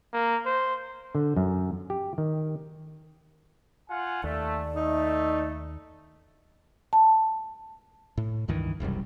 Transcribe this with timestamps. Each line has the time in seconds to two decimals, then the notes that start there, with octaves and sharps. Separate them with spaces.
0.13 A#3
0.46 C5
1.15 D3
1.36 F#2
1.90 G4
2.18 D#3
3.90 F4 F#5 G#5
4.24 D#2 A3 D5
4.76 A3 D#4
6.93 A5
8.17 A2
8.48 C#2 G2 D#3 E3
8.80 E1 C2 F#2 G3